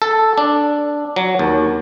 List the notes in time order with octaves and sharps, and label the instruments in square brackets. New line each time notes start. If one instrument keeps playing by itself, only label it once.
[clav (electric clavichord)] A4
D4
F#3
D#2